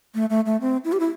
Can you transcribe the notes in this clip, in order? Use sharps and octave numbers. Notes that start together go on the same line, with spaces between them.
A3
A3
A3
C4
E4
G4
E4